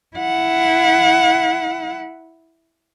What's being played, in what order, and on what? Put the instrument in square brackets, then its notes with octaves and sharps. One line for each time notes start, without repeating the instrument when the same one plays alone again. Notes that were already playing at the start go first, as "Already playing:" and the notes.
[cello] E4 F#5